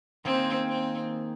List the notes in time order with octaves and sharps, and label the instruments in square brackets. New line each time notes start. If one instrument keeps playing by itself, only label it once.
[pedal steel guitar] D#3 A#3 G#4 C5 [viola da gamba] C4
[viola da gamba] C4